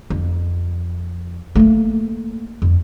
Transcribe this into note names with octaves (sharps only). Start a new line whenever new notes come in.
F2
A3 A#3
F2